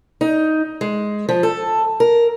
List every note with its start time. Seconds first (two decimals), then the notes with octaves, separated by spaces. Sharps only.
0.21 D#4
0.81 G#3
1.29 F3
1.43 A4
2.00 A#4